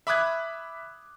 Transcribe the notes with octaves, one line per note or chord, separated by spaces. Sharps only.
E5 B5 D6 D#6 F#6 G#6